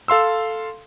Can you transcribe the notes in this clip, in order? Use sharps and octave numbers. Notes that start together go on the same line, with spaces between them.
A4 F5 C6 E6